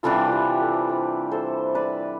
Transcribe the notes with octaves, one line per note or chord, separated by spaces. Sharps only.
C3 E3 G3 D4 F4 A4
A4
G4 B4
A4 C5
B4 D5
A4 C5
B4 D5